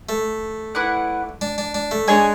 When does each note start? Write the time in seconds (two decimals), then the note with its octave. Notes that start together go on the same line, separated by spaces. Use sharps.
0.09 A3
0.75 E4 B4 D5 F#5
1.41 D4
1.58 D4
1.74 D4
1.91 A3
2.08 G#3 D4 G#4 C#5 G#5